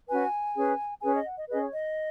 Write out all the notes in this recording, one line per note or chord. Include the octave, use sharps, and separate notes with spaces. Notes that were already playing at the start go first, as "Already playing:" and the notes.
C#4 F#4 B4 G#5
C#4 G#4 B4
C#4 G#4 B4 G#5
D#5
F#5
D#5
C#4 G#4 B4 D#5
C#5
D#5